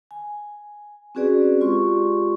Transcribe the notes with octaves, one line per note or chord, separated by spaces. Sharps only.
G#5
C4 C#4 F#4 G#4 B4 D5
G#3 F4 G4 D5 C6 C#6